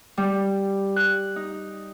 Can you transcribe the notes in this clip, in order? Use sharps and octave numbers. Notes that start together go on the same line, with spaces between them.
G3
F#6
D#4